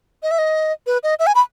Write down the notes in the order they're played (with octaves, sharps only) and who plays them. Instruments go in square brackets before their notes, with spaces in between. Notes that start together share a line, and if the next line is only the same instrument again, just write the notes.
[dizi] D#5
E5
D#5
B4
D#5
E5
G#5
B5